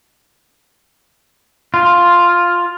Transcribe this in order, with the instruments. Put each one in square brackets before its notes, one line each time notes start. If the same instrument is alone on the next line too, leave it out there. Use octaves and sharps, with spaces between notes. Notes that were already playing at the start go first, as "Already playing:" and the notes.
[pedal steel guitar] F4